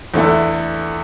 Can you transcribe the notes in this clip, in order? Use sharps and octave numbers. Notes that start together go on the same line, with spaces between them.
E2 D3 A3 E4